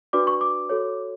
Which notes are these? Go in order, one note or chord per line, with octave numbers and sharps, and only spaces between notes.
D4 F#4 B4 D5 D6
C#6
D6
F#4 A4 C#5